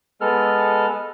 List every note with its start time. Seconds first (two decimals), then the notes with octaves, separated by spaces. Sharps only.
0.21 G#3 B3 A4 F6